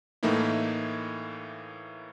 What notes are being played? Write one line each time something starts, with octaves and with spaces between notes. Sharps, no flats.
A2 E3 A3 A#3 D#4 E4